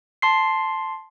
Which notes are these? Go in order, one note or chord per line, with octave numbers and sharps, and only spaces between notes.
A5 C6 C7